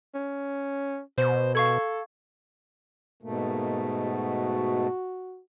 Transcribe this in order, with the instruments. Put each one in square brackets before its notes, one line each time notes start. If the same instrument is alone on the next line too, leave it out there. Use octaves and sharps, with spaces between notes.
[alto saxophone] C#4
[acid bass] B2 [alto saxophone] C5
[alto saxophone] A4 [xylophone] F5 C#6 G#6
[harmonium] G#2 B2 A3 [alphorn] A#3
[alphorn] F#4